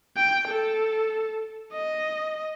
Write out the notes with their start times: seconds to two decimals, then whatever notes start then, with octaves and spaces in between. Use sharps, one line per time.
0.17 G5
0.48 A4
1.73 D#5